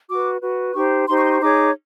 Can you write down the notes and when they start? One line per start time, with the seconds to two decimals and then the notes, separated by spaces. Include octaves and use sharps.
0.09 F#4 B4 D6
0.43 F#4 B4
0.74 D#4 G4 C5 C#6
1.08 D#4 G4 C5 C6
1.17 C#6
1.24 C6
1.33 C#6
1.41 D#4 G#4 C#5 D6